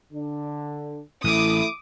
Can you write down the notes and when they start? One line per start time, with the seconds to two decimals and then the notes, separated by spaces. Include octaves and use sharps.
0.13 D3 D4
1.24 A1 A3 E4 D6 D#6